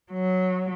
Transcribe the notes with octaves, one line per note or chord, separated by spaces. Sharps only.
F#3